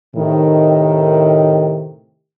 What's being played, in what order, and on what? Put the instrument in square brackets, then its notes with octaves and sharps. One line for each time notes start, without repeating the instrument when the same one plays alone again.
[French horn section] A2 C3 D#3